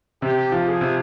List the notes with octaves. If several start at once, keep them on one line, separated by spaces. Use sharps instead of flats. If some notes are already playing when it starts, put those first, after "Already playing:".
C3 G4
F3
G#4
C3